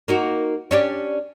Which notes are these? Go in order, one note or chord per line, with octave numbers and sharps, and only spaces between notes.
A#3 D#4 F#4
C#4 D4 G4